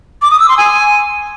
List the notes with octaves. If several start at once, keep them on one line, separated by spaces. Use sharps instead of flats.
D6
D#6
E6
C6
G#5